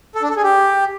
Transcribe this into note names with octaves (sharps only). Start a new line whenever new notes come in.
A4
D4
A4
G#4
G4